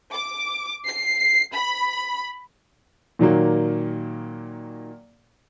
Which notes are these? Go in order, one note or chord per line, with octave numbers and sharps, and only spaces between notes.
D6
C7
B5
A#2 D#3 F#3 A#3